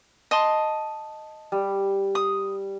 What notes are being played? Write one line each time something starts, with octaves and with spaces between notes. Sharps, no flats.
D#5 A5 C6
G3
D#6